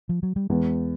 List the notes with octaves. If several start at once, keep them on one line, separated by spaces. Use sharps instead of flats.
F3
F#3
G3
E2 G#3